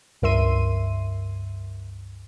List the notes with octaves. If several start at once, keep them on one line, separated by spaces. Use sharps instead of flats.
C#2 G2 A#4 E5 C6 D#7